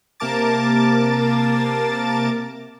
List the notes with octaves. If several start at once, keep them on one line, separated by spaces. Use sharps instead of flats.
C3 A#3 A#4 A5 D6 A6